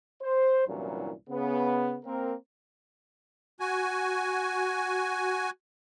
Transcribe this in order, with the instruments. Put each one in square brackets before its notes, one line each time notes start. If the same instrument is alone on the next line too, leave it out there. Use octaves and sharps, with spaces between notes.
[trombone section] C5
C2 G2 A#2 E3 F#3 C#4
C#3 B3
A#3 C4 A#4
[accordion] F#4 G#5